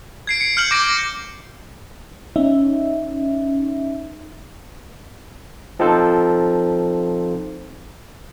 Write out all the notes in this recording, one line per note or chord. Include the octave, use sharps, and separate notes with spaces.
G#6 C7 D7
C#7
F6 G6 F#7
D6 A#6 D7
C#4 D#4 E5
F3 C4 D#4 A4 C5